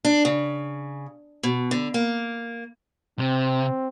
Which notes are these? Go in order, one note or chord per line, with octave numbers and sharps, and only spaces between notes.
D4
C#3
B2
D3
A#3
C3 C4